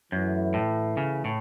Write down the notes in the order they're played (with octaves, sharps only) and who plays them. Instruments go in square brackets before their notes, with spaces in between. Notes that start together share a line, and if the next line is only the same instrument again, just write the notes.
[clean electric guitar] F#2 [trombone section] E3 A3 E4 B4
[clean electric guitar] A2
C#3
A2